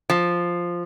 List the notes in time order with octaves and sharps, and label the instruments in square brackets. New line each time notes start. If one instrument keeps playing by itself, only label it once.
[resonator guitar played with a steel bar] F3